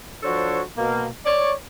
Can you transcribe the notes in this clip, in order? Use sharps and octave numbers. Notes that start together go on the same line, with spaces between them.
F3 D4 F#4 A4 C5 C#5
B2 A#3
C#5 D5